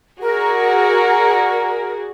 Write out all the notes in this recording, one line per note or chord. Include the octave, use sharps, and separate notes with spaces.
F#4 G#4 A#4 D5